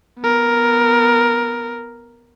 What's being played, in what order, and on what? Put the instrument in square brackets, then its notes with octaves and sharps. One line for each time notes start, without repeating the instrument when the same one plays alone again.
[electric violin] B3 A#4